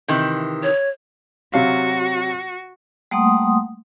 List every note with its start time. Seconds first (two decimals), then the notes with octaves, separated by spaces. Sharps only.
0.08 C3 D#3 E3
0.63 C#5
1.54 C3 F#3 F#4 F5
3.11 G3 A3 A#3 F#5 C6 D#6